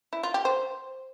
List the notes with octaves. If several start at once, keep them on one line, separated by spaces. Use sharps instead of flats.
E4
F4
G4
C5